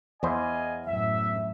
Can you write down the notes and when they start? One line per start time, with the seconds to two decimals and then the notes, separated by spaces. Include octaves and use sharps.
0.23 E2 E4 C5 D#5 F5 G#5
0.87 F#2 A2 E5